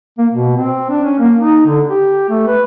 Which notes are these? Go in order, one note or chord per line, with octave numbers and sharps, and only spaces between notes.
A#3
B2
C4
D4
C#4
A#3
D#4
D3
G4
A3
B4